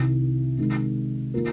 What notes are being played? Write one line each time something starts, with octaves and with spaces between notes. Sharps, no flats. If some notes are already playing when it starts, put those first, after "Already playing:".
Already playing: C2 C3 D#3
C3 D#3 G#3
D#3 A#3 F4 A#4